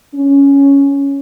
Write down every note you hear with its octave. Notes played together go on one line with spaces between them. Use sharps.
C#4